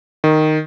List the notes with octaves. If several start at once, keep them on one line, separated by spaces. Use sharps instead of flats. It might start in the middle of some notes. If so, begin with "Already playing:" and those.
D#3